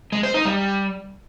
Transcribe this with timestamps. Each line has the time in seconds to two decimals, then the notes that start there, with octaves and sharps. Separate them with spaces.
0.12 G#3
0.23 C5
0.34 D#4
0.45 G3